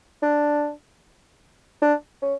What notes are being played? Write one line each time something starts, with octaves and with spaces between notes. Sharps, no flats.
D4
D4
C#4